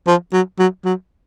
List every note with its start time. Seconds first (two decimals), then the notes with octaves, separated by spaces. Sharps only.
0.07 F3
0.33 F#3
0.59 F#3
0.85 F#3